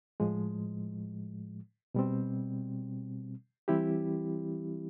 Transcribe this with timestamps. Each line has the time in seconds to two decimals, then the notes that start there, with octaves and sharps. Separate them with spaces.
0.20 A2 F3 G#3
1.95 B2 G3 C4
3.68 E3 G3 C4 E4 G4